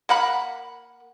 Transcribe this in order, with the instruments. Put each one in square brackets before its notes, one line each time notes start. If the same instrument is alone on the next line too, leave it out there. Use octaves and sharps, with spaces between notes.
[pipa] A#3 F#5 B5